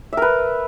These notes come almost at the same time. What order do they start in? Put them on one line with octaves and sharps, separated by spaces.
E5 A#4 B4